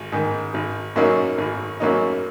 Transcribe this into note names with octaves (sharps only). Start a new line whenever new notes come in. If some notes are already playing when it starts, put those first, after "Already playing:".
Already playing: G#1
G#2 D#3
G#1
F#2 F#3 A#3 D#4
G#1
F#2 F#3 A#3 D#4